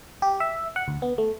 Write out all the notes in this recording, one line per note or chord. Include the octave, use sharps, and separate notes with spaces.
G4
E5
F#5
D2
B3
A3